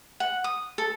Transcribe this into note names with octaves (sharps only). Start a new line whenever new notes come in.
F#5
D#6
A4